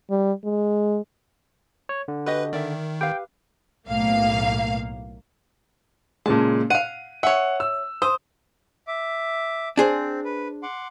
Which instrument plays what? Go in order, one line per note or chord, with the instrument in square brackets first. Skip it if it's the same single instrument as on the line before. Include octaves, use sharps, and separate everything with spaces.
[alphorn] G3
G#3
[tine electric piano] C#5
D3
[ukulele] F#4 G4 D#5 [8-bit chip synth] B4
[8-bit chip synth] D#3 [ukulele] D5 E5
[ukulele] G4 B4 F5 [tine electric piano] G5
[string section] B1 A2 A#3 F5
[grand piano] A#2 C#3 G#3 [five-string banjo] A5
[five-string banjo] F5 F#5 [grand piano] D#7
[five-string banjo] C#5 E5 [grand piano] F#5
[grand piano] E6
[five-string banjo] C5 [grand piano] D#6
[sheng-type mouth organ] E5 D6
[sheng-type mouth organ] C4 [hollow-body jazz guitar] D4 G#4 C5
[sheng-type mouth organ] B4
F#5 C6 D6